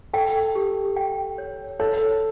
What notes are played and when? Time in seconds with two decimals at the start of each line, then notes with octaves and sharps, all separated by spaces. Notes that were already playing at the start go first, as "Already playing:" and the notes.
0.13 A4 G5
0.55 G4
0.96 G5
1.38 C#5
1.80 A4 C#5